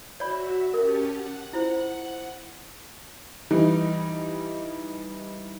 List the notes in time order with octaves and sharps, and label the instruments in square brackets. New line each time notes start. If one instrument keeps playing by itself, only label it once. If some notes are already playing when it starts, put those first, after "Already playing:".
[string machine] F#4 E5 [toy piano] C#5 D5 B5
[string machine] C#4 G4 A5 [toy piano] A#4
[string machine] F#5
[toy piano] E4 F4 C5
[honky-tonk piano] E3 G3 D#4